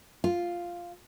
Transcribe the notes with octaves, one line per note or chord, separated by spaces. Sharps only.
F4